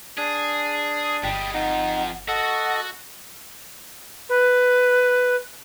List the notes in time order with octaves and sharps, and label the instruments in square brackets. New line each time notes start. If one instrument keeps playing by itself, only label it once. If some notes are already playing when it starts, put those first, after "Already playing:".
[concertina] D4 [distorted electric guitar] G#4
[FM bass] G1 [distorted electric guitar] G3 G#3 [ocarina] G5
[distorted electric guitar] F2 F4 [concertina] D#4 [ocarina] F#5
[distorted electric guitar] F#4 [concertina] A4 D#5 [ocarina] F#5
[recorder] B4